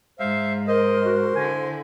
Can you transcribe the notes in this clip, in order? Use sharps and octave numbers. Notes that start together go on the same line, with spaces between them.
G#2 C5 E5 F5
A#4 C5 D#5
F#4
D3 E4 G#5